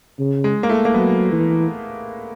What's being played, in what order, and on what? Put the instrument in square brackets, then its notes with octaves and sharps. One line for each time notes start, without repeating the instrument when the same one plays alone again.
[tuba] C#3
[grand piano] G#3
A#3
A3
A#3
[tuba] F#3 [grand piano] B3
[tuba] E3